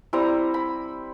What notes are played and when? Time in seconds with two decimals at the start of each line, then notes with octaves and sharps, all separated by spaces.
0.13 G3 C4 E4 A#5
0.54 B5